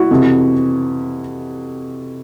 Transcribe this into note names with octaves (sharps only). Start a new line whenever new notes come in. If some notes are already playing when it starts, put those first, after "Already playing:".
Already playing: E4 F#4
F2 C3 E3